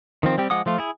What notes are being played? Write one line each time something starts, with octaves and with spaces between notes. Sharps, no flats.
D#3 F3 C4
G3 C4 G4
F3 G#3 F#5 D6 D#6
F3 A3 F4
E4 G#4